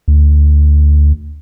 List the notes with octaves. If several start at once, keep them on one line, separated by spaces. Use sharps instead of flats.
D2